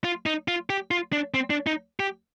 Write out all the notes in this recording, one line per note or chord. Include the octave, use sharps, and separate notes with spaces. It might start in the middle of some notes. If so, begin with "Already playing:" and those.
F4
D#4
F4
G4
F4
D4
C4
D4
D#4
G4